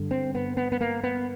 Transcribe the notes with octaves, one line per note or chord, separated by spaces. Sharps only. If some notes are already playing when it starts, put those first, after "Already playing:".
Already playing: G2 D3
C4
B3
B3
B3
A#3
B3